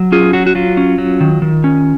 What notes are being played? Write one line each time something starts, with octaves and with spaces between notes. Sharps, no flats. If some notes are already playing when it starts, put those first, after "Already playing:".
Already playing: F#3
C#4 F4 G#4
F#3 F#4
F#4
F#3 F4
C#4
F#3
D#3
D#3
C#4